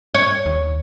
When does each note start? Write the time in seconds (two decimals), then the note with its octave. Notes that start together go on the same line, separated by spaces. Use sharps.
0.14 C#5
0.46 D#2